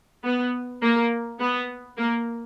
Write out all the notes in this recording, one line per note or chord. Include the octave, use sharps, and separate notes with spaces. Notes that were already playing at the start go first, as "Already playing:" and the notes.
B3
A#3
B3
A#3